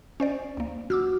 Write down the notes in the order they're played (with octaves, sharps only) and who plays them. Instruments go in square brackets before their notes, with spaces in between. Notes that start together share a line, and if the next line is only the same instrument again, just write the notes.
[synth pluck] C#4 C5 D5
D2 A#3
[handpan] F#4 [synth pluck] D6 E6 F6